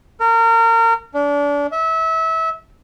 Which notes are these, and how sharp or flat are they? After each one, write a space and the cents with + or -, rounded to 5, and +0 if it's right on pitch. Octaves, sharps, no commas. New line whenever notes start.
A#4 -30
D4 -30
E5 -25